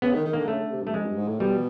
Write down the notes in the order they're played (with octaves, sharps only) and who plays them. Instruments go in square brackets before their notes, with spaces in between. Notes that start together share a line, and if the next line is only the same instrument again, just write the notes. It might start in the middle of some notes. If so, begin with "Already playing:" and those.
[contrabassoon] C#3 [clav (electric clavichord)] B3
[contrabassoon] D#3
D#3
[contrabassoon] D3 [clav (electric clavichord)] A#3
[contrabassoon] C#3 [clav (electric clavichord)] A3
[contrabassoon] D3
C3
[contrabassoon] G2 [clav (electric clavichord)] A3
[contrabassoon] F2 [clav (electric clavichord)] G#3
[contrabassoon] G2
G#2
A2
[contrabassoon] B2 [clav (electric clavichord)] G3